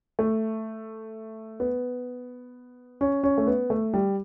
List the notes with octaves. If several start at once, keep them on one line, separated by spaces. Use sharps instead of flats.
A3
B3
C#4
C#4
A3
B3
A3
G3